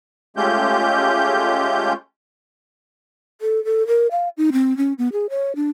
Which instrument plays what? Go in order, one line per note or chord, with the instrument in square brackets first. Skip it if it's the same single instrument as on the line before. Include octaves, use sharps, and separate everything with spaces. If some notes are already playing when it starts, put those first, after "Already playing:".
[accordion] G#3 A3 C#4 F4 G4 G6
[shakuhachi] A4
A4
A#4
F5
D#4
C4
C#4
B3
G#4
C#5
D4